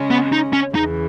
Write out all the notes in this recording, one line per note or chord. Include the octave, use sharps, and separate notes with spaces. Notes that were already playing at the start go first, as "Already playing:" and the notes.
Already playing: C#3 G#3 C#4
B3
D#4
C#4
E2 C#3 E3 D#4